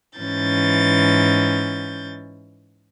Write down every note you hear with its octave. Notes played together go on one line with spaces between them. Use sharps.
G#2 E3 C#4 G6 A6